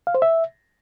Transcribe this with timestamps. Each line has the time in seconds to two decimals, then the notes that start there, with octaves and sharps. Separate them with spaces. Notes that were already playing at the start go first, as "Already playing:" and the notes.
0.07 F5
0.15 C5
0.22 E5